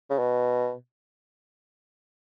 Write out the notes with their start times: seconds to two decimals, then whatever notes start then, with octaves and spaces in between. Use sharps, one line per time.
0.10 C#3
0.19 B2